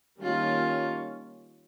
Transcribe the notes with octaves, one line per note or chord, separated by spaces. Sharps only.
D#3 G3 A#3 C#4 F4